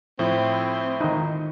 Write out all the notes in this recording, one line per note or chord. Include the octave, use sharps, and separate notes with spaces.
A2 F3 C4 E4
D#3 D#4